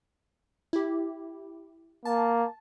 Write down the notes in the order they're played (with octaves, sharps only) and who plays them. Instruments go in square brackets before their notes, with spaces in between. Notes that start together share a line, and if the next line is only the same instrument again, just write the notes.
[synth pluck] E4 G4
[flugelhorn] A#3 [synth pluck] A5